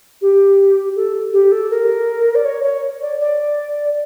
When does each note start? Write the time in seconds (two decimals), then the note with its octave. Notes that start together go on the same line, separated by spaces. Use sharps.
0.22 G4
0.96 A4
1.33 G4
1.52 A4
1.70 A#4
2.35 D5
2.45 C#5
2.63 C#5
3.02 D5
3.20 D5